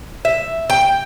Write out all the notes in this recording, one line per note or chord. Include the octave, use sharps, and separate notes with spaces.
E5
G5